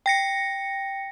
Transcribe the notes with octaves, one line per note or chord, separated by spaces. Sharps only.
G5 A#6 C#7